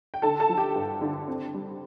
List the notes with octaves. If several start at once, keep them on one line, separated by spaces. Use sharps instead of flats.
G5
D3 A4 A5
A4 A5
F3
G4 G5
G2
D3
C4
G3